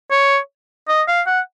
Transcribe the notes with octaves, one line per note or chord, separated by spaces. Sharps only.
C#5
D#5
F5
F#5